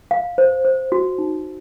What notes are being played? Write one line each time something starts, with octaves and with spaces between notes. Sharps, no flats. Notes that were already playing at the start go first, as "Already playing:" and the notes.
F5
C5
C5
F#4
D#4